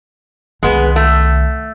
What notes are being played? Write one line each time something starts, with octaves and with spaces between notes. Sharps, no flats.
C2 D#3 G#3 B3
A3